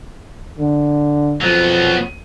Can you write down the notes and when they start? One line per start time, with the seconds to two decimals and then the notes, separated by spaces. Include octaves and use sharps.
0.58 D3
1.41 F2 F#3 B3